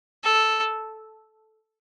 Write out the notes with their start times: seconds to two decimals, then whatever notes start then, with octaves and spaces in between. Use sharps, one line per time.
0.24 A4